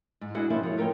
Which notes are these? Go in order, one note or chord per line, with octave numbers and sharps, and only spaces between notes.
G#2
D4 E4 F#4 G#4 D#5 F#5
F3 G3 A#3 C#4 E4
F3 G#4 C#5
A3 F4 A#4 C#5 G5